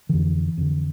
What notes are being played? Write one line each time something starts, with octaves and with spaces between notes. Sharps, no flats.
F2 D3 E3
F2 D3